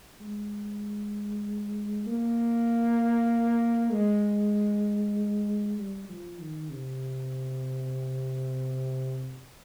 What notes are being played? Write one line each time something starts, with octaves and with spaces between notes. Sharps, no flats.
G#3
A#3
G#3
G3
F3
D#3
C3